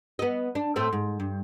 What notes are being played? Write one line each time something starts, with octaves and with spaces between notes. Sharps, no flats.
B3 D#5
D4
A2 A3 C4
G#2
G2